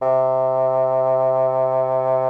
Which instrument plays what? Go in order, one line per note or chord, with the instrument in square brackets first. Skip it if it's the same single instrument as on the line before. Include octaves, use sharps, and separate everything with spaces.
[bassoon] C3